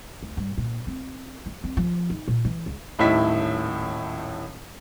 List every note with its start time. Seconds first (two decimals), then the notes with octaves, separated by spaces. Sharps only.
0.23 D2
0.37 G2
0.58 A#2
0.87 C4
1.46 F3
1.64 C4
1.77 F3
2.10 D#4
2.28 A#2
2.45 E3
2.66 C#2
2.99 D#1 A2 D#3 E4 B6